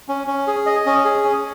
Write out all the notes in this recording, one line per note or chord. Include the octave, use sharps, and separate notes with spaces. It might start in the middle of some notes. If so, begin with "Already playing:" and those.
C#4
C#4
G#4
D#5
C#4
G#4
C#4